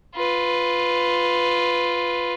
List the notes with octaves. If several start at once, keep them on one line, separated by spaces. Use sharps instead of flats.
F4 B4